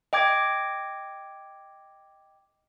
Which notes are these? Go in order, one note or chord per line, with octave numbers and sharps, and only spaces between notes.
D#5 G5 D6 G#6